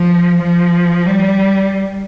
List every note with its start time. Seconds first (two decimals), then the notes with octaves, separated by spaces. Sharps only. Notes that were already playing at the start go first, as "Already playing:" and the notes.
Already playing: F3
0.42 F3
1.06 G3